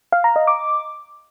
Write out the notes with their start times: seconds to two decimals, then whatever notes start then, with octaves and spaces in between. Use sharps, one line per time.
0.12 F5
0.24 A#5
0.36 D#5
0.47 D6